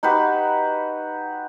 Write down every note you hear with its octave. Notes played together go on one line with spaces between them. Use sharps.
D#4 F#4 G4 B4